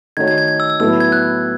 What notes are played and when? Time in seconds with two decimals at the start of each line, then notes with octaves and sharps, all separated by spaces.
0.17 D#3 A3 D#4 F#4 C#5 G#6
0.28 G#6
0.38 G#6
0.48 G#6
0.60 E6
0.70 E6
0.80 A2 F#3 B3 E4 A4 E6
1.00 G#6
1.12 F#6